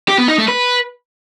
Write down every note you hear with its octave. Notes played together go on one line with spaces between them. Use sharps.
G4
B3
D#4
A3
B4